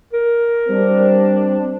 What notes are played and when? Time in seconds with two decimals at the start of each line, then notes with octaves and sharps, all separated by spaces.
0.13 A#4
0.69 G3 C4 D4